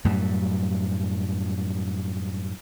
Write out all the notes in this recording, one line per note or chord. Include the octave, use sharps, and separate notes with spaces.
F#2 A2 F#3 G3